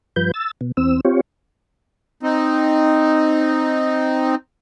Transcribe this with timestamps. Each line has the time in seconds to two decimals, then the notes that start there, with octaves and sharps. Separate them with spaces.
0.16 G2 F3 B4 G6
0.34 E6 A6
0.61 B2
0.77 E2 C4 E6
1.05 C4 F4 G4 C#5
2.23 C4 D#4